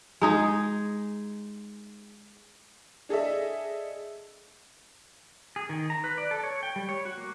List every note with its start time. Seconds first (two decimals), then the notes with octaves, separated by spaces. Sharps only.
0.21 G#3 D#4 G#4
3.09 D4 G#4 A4 D#5 E5
5.56 G#4
5.69 D#3
5.90 A#5
6.04 B4
6.18 D5
6.31 A4
6.43 C#5
6.63 G5
6.76 G3
6.89 C#5
7.05 F#4
7.18 A#3